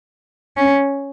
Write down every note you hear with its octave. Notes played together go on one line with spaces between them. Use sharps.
C#4